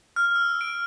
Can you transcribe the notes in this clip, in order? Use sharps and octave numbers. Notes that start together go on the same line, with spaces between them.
F6
E6
D7